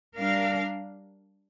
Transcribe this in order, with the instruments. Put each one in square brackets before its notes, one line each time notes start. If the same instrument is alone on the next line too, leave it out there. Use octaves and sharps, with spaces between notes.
[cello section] G3 D4 A#4 F5